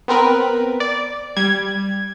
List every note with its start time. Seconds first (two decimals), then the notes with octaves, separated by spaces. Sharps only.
0.08 B3 C4 A#4 B4
0.80 D5
1.37 G3 G#6